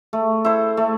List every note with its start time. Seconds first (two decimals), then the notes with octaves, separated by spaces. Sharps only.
0.13 A3
0.44 E4 A4 C5
0.77 A3